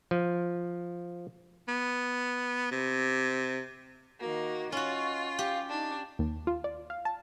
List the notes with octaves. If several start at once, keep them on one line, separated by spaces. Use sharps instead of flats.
F3
B3
C3
D#3 A#3 F#4
C#4 F4 F#4 D#5
G4 F5
D4 D#4
D#2
F4
D5
F5
A5